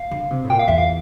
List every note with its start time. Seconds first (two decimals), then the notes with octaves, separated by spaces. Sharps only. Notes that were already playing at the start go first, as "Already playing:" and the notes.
Already playing: F5
0.11 D3
0.30 C3
0.44 A2
0.50 A#2 G5
0.59 F5
0.68 E2 E5
0.78 F5